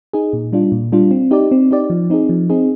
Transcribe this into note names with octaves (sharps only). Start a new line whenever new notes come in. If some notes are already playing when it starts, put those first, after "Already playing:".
D#4 G#4
A#2
G3 D4 F4
A#2
G3 D4 F4
C4
D#4 G4 D5
C4
D#4 G4 D5
F3
C4 D#4 G#4
F3
C4 D#4 G#4